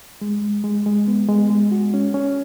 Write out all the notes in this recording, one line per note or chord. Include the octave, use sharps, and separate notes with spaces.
G#3
G#3
G#3
G#3
B3
G#3
G#3
F#4
C#4
C#4